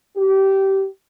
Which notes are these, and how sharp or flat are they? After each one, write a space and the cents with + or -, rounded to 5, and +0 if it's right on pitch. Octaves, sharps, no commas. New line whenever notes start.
G4 -20